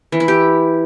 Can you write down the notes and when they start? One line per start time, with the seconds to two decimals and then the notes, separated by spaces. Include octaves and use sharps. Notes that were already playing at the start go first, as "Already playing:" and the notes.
0.12 E3
0.20 E4
0.28 G4